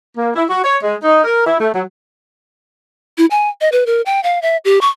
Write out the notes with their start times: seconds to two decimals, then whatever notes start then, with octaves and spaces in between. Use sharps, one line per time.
0.18 A#3
0.36 E4
0.50 F#4
0.64 C#5
0.83 G#3
1.04 D#4
1.24 A#4
1.47 E4
1.59 A3
1.74 F#3
3.18 E4
3.31 G#5
3.61 D#5
3.72 B4
3.86 A#4
4.06 G5
4.23 F5
4.42 E5
4.65 G4
4.81 C#6